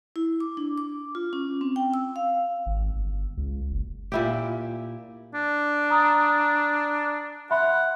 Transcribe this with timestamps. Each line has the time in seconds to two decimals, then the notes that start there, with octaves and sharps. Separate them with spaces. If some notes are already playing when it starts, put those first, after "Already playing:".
0.16 E4
0.40 D6
0.57 D4
0.78 D6
1.15 F4
1.33 C#4
1.61 C4
1.76 G5
1.94 E6
2.16 F5
2.66 G#1
2.95 G1
3.37 C#2
3.71 F#1
4.12 A#2 E4 G4
5.35 D4
5.90 A#5 D#6
7.51 E5 F#5 B5 C6